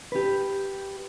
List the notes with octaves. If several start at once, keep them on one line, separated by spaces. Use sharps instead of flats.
G4 B4